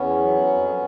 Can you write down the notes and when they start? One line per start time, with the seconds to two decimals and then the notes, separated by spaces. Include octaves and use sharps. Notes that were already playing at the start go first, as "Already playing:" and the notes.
Already playing: E2 B3 C#4
0.18 F#3
0.46 F2